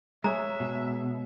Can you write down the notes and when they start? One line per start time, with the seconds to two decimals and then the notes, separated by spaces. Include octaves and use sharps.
0.24 G#3 G#4 C#5 E5 A#5
0.60 B2